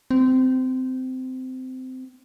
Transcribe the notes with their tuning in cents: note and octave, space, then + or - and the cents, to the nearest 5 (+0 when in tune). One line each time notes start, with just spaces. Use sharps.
C4 -20